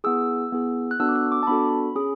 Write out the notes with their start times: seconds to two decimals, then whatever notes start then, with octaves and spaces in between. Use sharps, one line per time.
0.04 B3 E4 G#4 E6
0.52 B3 E4 G#4
0.91 F#6
1.00 B3 D4 F#4 A4 E6
1.09 D6
1.16 E6
1.32 D6
1.43 A5
1.47 B3 D4 F#4 A4 B5
1.95 C#4 G#4